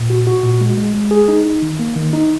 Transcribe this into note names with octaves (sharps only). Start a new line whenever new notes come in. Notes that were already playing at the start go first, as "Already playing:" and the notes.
Already playing: A#2
F#4
F#4
A#2
G#3
G#3
G#3
G#4
D#4
D#4
D#3
A#3
D#3
D#4